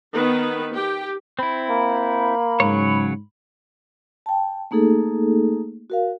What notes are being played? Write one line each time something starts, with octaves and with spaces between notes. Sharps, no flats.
D#3 B3 B4
G4 G5
C4 E4 B5
A#3
G#2 C#3 F#3 C#5
G5 A5
A3 A#3 D#4 G#4 A4
F#4 A#4 F5